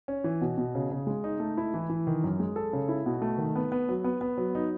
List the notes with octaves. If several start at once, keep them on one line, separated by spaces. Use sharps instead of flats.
C#4
E3
B2
B2
C#3
C#3
G#3
D#4
A3
E4
E3
E3
D#3
F#2
G#3
A4
C#3
E4
B2
A3
D#3
B3
B3
F#3
B3
B3
F#3
D#4